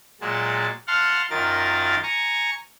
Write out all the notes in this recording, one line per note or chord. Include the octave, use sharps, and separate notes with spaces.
A#2 F#3 G#3 A5
F5 F#5 A5 C6 F6
F#2 D#3 F4 A#4 A6
G#5 A#5 C#6